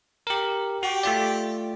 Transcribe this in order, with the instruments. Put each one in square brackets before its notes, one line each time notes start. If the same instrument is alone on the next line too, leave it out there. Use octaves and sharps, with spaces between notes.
[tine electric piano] G4 A#4
[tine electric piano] F#4 [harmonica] G4
[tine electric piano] A3 F4 D5